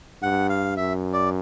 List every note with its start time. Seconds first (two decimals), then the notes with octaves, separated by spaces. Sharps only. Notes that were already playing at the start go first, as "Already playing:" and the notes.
0.22 G2 F#5
0.50 F5
0.77 F#2 E5
1.13 D5